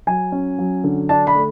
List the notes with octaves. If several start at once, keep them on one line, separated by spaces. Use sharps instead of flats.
F#3 G#5
C#4
F#3
D3
D4 A5
B5
A3